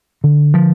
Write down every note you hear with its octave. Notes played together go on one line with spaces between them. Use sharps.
D3
F3